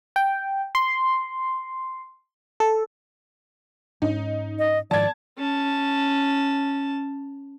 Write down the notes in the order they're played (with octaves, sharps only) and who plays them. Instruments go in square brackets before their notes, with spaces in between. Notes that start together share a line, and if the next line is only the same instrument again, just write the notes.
[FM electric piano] G5
C6
A4
[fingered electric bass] G#2 C#4 [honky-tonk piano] D#4
[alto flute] D#5
[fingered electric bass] G#2 D#3 F3 [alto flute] D5 [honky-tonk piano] A5 G#6
[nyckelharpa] C#4 A5